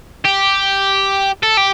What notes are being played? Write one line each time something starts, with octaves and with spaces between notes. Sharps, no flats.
G4
A4
G4